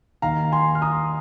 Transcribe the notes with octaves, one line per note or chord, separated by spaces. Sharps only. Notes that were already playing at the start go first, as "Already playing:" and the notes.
D#2 D#3 A#3 F5 A#5
G#5 C6
F6
A#5 D#6